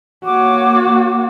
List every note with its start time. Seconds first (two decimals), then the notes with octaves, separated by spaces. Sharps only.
0.25 A#3 F#4 C#5 D6